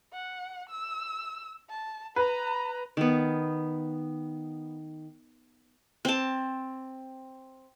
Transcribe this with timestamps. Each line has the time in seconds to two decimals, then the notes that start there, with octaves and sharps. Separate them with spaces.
0.13 F#5
0.70 E6
1.69 A5
2.16 B4 A#5
2.97 D#3 B3
6.05 C4 A5